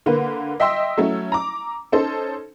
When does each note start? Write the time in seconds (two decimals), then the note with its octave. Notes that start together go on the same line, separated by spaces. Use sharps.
0.06 D3 A#3 B4
0.60 D#5 E5 G5 C6 E6
0.97 F#3 A3 C#4 E4
1.32 A#5 D6
1.92 C#4 D#4 A4 C5